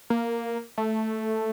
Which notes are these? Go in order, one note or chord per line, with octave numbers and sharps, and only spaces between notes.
A#3
A3